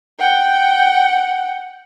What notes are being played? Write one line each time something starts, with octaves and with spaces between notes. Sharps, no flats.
F#5 G5